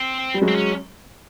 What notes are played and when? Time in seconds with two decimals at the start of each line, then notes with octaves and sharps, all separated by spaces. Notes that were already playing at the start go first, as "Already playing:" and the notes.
Already playing: C4
0.34 G3
0.41 F#3 G#3
0.48 C4
0.55 C#4